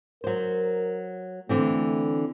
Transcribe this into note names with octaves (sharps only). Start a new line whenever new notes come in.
F#3 A#4 C5
D3 E3 A3 C4